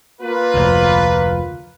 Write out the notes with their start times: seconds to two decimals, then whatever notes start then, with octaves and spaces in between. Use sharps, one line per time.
0.21 A#3 F4 B4
0.54 F1 D2